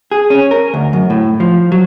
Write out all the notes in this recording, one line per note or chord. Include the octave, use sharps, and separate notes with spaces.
G#4
C#4
A#4
D2
F#2
A2
F3
F#3